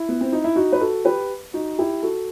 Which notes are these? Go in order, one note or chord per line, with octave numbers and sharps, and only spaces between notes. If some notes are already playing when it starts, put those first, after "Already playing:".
Already playing: E4
B3
C4
D#4
E4
D#4 F#4
B4
F#4 A4
G4 B4
D#4 F#4
E4 G4
F#4 A4